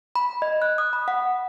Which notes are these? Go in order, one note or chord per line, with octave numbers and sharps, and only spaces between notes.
B5
D#5
F#6
D#6
B5
F#5